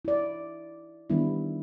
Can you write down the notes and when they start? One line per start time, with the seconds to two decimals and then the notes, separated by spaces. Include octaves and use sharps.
0.05 E4 D5
1.10 D#3 G3 B3 D4 E4